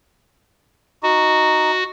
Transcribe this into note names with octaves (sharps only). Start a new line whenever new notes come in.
D#4 F#4